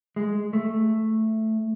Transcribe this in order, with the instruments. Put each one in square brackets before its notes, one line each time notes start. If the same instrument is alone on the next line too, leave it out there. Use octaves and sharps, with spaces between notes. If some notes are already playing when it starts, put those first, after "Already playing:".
[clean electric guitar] G#3
A3